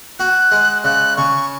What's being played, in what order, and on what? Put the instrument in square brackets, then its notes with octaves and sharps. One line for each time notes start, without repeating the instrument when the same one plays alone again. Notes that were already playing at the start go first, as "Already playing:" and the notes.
[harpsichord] F#4 [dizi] F#6
[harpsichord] G#3
[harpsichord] C#3 [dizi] F#6
[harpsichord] C#3 [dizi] C#6